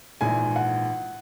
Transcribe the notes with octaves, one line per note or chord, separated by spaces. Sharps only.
A#1 G#2 E3 G#5
F#5